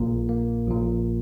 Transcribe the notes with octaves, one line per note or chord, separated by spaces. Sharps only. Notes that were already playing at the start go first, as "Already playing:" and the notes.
Already playing: A#1 A#2 A#3
A#3
A#1 A#2